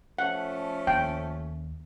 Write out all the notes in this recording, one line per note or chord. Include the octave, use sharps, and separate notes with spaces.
F3 A3 C#4 F#5
D#2 G5